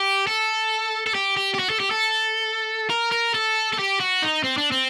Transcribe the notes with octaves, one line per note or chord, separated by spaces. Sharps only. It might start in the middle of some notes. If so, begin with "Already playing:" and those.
Already playing: G4
A4
A4
G4
G4
G4
F#4
A4
G4
A4
A#4
A#4
A4
A4
G4
F#4
D#4
C4
D4
C4